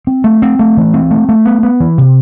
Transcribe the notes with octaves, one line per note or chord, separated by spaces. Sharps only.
C4
A3
C4
A3
E3
C4
A3
A3
B3
B3
E3
C3